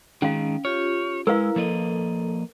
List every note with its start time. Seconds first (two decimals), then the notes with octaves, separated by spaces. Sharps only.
0.22 D#3 G#3 C#4 F5
0.65 F4 G4 C#5
1.27 G#3 E4 A#4 B4 F5 A#5
1.56 F3 A#3 A4 D#5